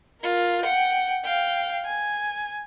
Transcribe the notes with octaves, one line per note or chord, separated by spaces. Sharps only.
F4 A#4
F#5 G5
F5 G5
G#5